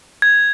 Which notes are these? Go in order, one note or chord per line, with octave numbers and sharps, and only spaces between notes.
G#6